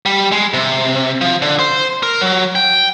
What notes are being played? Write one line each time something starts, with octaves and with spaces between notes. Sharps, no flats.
G3
G#3
C3
F3
D3
C5
A#4
F#3
G5